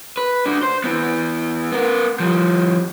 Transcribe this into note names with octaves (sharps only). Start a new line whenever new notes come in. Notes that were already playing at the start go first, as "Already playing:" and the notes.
B4
D4 F#4
C5
B3 E4
B3 A#4
F3 G3